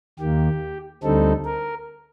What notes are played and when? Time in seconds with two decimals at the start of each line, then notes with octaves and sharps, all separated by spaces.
0.19 D#2 D#3 A#3 G4
1.03 D2 D3 G3 C4 D#4 A4
1.45 A#4